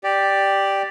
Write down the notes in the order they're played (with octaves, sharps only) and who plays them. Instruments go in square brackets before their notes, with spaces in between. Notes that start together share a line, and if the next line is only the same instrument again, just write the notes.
[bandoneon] G4 D5